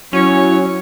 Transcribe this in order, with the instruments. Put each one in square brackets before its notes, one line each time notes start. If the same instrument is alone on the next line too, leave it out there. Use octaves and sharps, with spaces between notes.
[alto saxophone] F#3 [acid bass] C#4 [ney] E4 [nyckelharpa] C#5